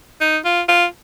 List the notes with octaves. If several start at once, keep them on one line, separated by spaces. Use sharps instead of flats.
D#4
F4
F4